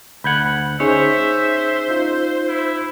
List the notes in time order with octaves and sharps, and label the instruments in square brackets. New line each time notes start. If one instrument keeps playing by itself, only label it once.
[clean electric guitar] D2 F#5 [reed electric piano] B5 G6 G#6
[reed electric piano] C#4 D#4 G#4 [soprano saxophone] C5 [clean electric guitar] C#5 [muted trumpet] E5
[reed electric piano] D#4 F4
[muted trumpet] E4